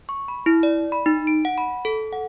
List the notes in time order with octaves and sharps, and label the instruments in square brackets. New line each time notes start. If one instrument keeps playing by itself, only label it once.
[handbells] C#6
B5
E4
D5
B5
D#4
D7
F#5
B5
A4
F#5